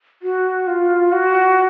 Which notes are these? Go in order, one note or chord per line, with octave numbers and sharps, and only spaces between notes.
F#4
F4
F#4